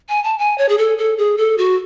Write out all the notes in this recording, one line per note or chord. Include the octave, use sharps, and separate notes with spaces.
G#5
A5
G#5
C#5
G#4
A4
A4
G#4
A4
F#4